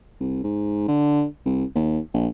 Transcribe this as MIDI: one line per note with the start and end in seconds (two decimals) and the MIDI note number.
0.20 0.43 36
0.44 0.86 44
0.88 1.25 50
1.45 1.64 36
1.75 1.99 39
2.14 2.28 34